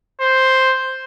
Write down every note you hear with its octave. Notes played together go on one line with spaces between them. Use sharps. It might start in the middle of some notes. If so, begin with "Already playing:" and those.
C5